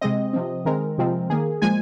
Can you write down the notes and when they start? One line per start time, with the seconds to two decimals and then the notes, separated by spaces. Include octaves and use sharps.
0.01 C3 G#3 C4 D#5
0.33 C3 F3 C4
0.65 D#3 G#3 C4 A#4
0.98 C3 F3 G#3 C4
1.30 D#3 A#3 G#4
1.62 A#2 F3 G#3 G#5